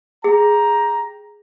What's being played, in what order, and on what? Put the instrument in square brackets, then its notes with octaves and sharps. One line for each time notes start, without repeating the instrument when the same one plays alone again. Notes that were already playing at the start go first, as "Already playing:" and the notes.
[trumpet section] G4 A#5 [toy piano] G#4